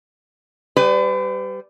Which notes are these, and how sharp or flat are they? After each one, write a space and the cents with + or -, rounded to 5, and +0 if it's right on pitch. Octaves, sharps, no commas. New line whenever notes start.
G3 -10 B4 +40 G#5 +0